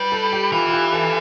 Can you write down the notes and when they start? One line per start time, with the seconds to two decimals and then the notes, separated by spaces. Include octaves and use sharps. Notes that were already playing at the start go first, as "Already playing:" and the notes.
Already playing: G3 B4
0.12 A4
0.32 G4
0.52 E3 F4
0.68 F4
0.73 G4
0.93 A4